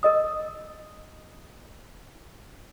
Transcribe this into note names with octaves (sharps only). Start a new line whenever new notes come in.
A#4 D#5 D#6